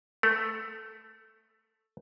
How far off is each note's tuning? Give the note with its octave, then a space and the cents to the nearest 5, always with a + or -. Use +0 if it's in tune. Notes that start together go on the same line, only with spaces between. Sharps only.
A3 +0 A4 +25